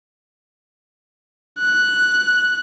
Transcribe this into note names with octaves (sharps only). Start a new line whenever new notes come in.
F#6